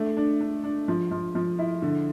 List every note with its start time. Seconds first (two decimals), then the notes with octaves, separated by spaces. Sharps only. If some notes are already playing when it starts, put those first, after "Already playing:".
Already playing: A3 D4
0.17 D4
0.40 D4
0.64 D4
0.88 F3
1.11 F3
1.35 F3
1.59 E4
1.82 D3